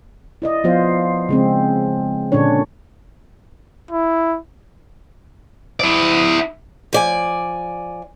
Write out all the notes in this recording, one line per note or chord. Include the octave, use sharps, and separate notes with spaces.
E4 D5 D#5
F3 B3 F4 C5
C#3 G#3 C4
A#2 D3 C#4 D4 C#5
E4
E4 D5
F3 D5 G#5